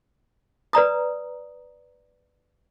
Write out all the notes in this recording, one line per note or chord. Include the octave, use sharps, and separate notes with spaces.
B4 D5 A#5 D#6